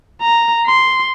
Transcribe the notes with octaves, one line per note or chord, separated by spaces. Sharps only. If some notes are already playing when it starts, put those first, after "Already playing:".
A#5
C6